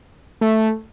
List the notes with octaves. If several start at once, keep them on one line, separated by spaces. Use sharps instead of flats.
A3